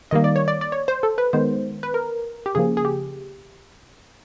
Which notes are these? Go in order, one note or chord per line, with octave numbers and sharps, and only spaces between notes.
D#3 G3 A#3 D#5
D5
C#5
D5
D5
C#5
C5
A4
B4
D#3 G#3 B3 C5
B4
A#4
G4
C#3 F3 A#3 G#4
G#4
G4